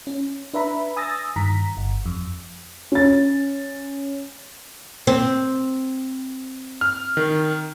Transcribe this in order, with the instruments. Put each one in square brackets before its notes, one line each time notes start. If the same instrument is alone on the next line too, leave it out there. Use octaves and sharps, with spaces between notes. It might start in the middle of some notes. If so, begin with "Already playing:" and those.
[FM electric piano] C#4
D4 B4 E5 A#5 B5
G#5 D#6 E6 A6 A#6
G2 D#3 A#5 B6
G1
F2
[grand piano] C#4 A6
[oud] C4
[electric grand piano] F6
D#3